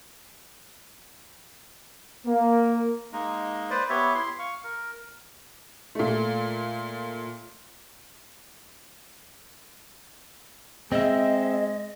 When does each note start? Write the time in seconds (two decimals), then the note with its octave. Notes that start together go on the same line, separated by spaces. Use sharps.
2.26 A#3
3.13 G#3 A#3 D#4
3.70 B4 C5 D5
3.90 B3 G4 C#5 E5
4.15 E4 C6
4.39 F5 C#6
4.64 A#4
5.95 A#2 A3
10.92 G#3 C4 D#5 E5